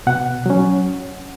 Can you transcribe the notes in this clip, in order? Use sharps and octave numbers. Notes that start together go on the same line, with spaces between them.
B2 F#5
F#3 C#4